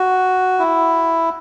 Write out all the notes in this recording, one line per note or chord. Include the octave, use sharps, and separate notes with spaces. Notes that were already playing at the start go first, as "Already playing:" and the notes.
Already playing: F#4
E4